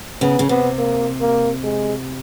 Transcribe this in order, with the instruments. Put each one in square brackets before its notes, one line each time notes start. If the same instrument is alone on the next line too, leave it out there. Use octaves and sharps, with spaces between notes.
[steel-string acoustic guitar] C#3 [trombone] B3
[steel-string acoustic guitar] C#3
[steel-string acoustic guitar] C3 [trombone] B3
[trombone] A#3
A#3
G#3